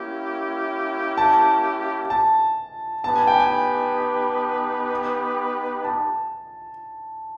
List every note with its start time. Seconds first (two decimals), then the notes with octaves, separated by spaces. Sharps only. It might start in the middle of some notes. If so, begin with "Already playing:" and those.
Already playing: A#3 C#4 E4 G4
1.18 A5
2.10 A5
3.04 B3 D#4 G4 B4 A5
3.16 G#5
3.27 G5
3.40 G#5
5.84 A5